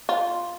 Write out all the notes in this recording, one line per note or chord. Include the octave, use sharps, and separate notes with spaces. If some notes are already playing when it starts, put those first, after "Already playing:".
F4